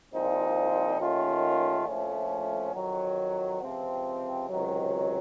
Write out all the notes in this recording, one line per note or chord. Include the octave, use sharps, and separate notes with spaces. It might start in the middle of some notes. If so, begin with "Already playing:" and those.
C2 A#2 F3 C4 D#4
D#2 D#3 A3 C#4 F4
A#1 A2 F3 A3 C#4
F2 D#3 F#3
C#2 C3 F3 C4
C#2 C3 D#3 F#3